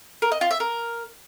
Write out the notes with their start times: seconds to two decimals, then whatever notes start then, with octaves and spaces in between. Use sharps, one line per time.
0.22 A#4
0.32 D#5
0.41 F4
0.51 E5
0.60 A#4